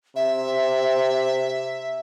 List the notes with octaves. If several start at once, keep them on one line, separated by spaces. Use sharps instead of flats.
C3 E5